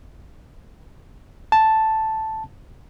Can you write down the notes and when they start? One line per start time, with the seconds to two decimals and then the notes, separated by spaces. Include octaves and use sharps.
1.52 A5